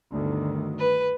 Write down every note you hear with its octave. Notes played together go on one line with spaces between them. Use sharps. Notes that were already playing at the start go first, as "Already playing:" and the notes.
G1 D2 D#3
B4